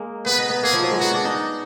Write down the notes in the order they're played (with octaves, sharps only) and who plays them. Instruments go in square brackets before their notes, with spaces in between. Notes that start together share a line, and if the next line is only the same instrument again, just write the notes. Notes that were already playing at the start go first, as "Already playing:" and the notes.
Already playing: [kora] G#3 A#3
[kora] B3 [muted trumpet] B4
[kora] D#4
B3
[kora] A#3 [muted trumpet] G#4
[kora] F3
F#3
G#3
[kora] B3 [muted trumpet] F#4
[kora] D4
D#4